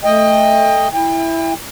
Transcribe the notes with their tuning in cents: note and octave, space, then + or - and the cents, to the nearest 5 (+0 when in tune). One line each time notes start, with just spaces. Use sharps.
A3 +0 D#5 +0 G5 +30
E4 +0 G5 +40